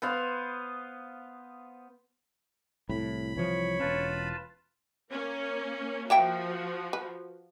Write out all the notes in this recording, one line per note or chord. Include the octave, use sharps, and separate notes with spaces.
B3 C5 F5
C2 A2 B5
C2 E3 F3 C#5
E1 C#4 F4 B4 A5
A#3 C#4
F3 A#3 F#4 E5 G5
B4